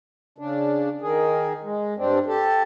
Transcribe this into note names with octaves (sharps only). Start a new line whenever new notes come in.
C#3 D4
D#3 G#4
G#3
G2 C4 D4
G4 A4